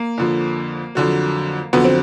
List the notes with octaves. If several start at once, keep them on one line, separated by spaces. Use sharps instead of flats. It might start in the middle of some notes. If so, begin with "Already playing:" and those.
Already playing: A#3
F2 D3 F3
F2 D3 F#3
F2 D3 F#3 B3
C4